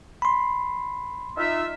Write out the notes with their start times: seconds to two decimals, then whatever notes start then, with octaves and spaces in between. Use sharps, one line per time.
0.22 B5 C6
1.37 D#4 F4 E5